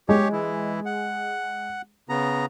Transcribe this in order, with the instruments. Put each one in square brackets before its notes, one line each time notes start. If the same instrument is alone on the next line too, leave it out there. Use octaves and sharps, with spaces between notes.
[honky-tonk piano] G#3 [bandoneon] G4 C#5
[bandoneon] E3 E4
F#5
C#3 B3 A#5